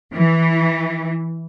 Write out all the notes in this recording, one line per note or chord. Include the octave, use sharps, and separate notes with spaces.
E3